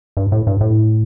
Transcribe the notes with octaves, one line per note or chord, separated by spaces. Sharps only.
G2
A2
G2
A2